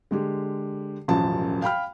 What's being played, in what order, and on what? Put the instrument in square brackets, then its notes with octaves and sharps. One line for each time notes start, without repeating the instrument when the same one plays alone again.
[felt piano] D3 G#3 G4
E1 A1 F#2 F3 A5
F5 G5 B5 F6